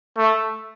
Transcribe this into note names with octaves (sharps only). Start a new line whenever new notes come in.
A3